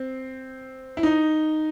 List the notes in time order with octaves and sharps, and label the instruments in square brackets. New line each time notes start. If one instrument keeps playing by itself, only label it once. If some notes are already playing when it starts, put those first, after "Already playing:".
Already playing: [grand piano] C4
E4
D#4